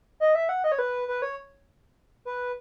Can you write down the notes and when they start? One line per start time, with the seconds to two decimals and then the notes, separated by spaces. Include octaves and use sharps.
0.20 D#5
0.35 E5
0.49 F#5
0.64 D#5
0.72 C#5
0.79 B4
1.08 B4
1.22 C#5
2.25 B4